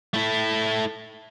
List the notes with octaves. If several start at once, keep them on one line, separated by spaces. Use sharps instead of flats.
A3 E4